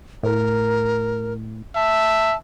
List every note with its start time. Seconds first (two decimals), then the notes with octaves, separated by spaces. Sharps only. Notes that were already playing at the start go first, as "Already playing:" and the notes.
0.23 A2 A#4
1.76 E5 A5